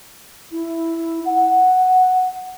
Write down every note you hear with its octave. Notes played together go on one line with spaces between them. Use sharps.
E4
F#5